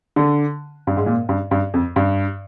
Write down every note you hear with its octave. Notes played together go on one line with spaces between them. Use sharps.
D3
G2
G#2
A#2
G2
G2
F2
G2